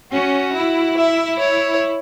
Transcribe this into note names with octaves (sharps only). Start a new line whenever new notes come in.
C#4 F#4
E4
E5
C#5